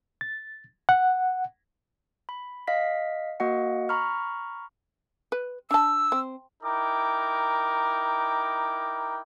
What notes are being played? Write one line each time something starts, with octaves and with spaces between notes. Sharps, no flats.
A6
F#5
B5
D#5 F5 B6
A#3 F#4 D#5 F#5
A#5 B5 C#6 F6
B4
D4 A5 E6
C4
D#4 E4 A#4 G5 D6